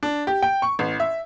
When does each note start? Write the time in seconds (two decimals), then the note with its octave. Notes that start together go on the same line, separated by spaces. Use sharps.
0.03 D4
0.27 G4
0.42 G5
0.62 C#6
0.79 A1
1.00 E5